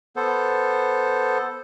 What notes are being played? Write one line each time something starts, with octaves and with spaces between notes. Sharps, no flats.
B3 A4 C5